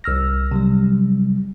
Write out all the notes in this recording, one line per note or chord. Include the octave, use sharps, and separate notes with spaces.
C2 E6 F6 A#6
C3 F#3 G3